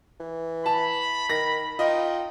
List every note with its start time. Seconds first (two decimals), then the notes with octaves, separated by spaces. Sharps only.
0.20 E3
0.66 A5 B5
1.30 D#3 A#6
1.79 D#4 F4 D#5 G5